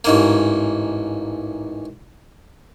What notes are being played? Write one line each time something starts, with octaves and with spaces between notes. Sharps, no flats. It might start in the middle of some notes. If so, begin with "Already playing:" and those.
A1 G#2 A#3